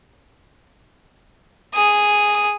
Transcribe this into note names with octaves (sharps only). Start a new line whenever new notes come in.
G#4 D#6